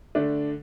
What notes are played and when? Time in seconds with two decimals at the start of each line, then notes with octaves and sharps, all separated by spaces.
0.15 D3 A3 D4